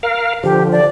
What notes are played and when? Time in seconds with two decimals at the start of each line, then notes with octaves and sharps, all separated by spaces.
0.03 A#4 F5
0.44 D3 F3 G4
0.71 D5